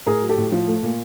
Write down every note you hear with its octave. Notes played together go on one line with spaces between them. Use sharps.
A2 G#4 A#4
F#3
G4 A4
A2
F3
A3
A#2